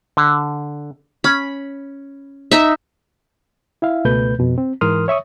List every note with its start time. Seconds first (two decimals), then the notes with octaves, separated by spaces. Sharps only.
0.17 D3
1.24 C#4 B5
2.51 D#4 E5
3.82 E4 E5 F5
4.05 C#2 B2 A3 B4 G6
4.39 F2 B2
4.58 C4
4.81 G#2 E3 A#4 C6 D#6 F6
5.08 C#5 E5 C#6 D#6